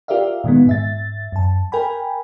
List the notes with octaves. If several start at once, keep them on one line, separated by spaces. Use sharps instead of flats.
F4 G4 A#4 D5 E5 F5
A#2 D#3 G#3 B3
G#2 E5 A6
F#2 A5
A#4 G5 G#5 B5